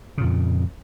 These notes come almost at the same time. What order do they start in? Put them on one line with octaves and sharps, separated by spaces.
C#3 A#2 F2